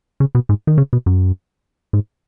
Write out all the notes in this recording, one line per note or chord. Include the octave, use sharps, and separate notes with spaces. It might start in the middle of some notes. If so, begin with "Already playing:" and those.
C#3
B2
G#2
D#3
C#3
B2
F#2
G#2